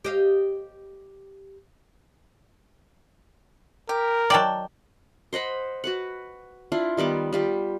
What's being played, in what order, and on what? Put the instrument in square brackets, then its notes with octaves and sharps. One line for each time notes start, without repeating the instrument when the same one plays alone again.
[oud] G4 D#5 F5
[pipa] G4 [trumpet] A#4
[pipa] D#3 G5 A5 [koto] F#3 D5
[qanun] C5 D#5 F#5 B5
F#4 B4 F#5
D4 E4 F4
D#3 G3 B3 D6
G3 F4 G4